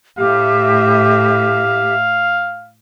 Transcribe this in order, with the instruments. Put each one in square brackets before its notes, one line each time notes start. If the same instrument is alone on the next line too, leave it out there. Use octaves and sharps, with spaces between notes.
[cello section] A2 E5 [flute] G4 [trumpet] F5